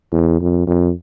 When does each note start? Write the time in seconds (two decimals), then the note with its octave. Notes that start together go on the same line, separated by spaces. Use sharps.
0.12 E2
0.40 F2
0.67 F2